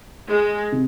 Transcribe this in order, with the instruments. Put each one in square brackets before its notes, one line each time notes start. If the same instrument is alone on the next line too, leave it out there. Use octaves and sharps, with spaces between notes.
[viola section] G#3
[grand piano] C3